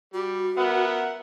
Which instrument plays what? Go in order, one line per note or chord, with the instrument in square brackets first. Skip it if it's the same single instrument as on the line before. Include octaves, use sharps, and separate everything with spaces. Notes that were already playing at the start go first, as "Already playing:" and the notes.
[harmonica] G3 [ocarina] F#4
[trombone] B3 [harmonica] A#4 E5 F#5